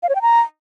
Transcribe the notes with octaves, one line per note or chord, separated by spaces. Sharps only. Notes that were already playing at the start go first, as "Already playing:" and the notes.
F5
C#5
G5
A#5